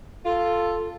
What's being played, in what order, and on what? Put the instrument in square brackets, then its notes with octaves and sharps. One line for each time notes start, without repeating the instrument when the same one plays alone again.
[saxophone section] F4 [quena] A4